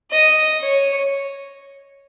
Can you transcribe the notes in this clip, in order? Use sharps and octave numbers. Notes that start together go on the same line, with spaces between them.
D#5
C#5